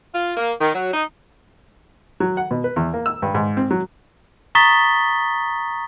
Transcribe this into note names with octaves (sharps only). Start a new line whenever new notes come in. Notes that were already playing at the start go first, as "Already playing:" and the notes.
F4
A#3
D#3
F#3
D#4
F#3
F#5
B2
B4
E2
A#3
E6
G2
G#2
C4
F#3
A#5 C#6 D#6 A6 B6 G7